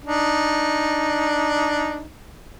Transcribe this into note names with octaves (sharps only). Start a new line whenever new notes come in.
D4 D#4